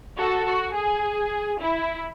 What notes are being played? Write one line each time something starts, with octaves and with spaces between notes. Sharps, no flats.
F#4 A4
F#4
G#4
E4